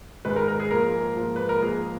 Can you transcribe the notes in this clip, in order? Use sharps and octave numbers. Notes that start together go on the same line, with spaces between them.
G#2 D#3 G#3 B4
A#4
A#4
G#4
G#2 F3 A#3 A#4
G#2 F3 A#3
B4
A#4
G#2 F3 A#3 G#4